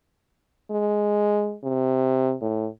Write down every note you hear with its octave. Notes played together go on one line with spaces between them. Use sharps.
G#3
C3
A2